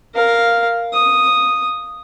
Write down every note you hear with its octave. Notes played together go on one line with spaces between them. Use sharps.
A#4 F5
D#6